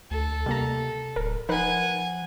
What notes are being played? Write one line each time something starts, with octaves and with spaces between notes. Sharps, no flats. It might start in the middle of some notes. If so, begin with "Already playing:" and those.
D2 A4
C3 G3 A#3 A#5
D1 A#4
F3 D#4 A#4 B4 F#5 G#5